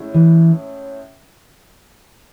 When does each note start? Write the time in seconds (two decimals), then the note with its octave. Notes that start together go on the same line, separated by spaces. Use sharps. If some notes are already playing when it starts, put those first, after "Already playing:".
Already playing: A2 G#3 C#4 E4
0.14 E3